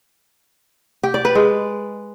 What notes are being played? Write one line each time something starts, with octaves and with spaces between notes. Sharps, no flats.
G4
D5
B4
G#3